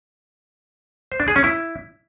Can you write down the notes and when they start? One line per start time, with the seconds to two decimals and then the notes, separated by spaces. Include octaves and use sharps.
1.12 C5
1.20 D4
1.28 G#4
1.36 C#4
1.44 E4